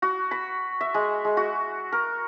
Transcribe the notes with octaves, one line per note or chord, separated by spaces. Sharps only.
F#4
B5
E5
G#3
G#3
F#4
A#4